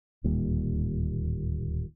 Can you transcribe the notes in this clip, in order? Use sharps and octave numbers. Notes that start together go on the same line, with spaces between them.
D1 D#2 A#2 G3